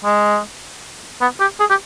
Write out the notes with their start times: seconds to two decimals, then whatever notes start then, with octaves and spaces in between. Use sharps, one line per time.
0.05 G#3
1.21 B3
1.40 G4
1.60 G#4
1.70 G4